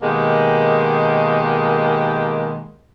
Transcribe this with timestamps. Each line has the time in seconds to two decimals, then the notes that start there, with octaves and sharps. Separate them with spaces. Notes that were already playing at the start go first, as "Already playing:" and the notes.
0.03 B2 D#3 G#3 A#3 G4